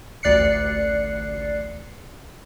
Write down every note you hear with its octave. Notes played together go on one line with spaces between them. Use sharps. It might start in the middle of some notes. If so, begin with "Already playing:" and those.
A1 D2 D5 F#6 C7 C#7